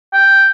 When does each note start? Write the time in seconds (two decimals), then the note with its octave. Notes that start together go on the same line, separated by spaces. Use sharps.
0.14 G5